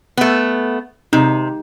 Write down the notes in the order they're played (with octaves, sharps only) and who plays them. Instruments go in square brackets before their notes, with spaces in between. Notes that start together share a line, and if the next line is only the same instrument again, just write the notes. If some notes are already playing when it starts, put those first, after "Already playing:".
[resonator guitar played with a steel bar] A3 B3
[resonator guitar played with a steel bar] C3 [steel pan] D#4